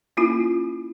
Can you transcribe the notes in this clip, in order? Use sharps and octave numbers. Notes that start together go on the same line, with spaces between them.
A#3 C#4 E4 F4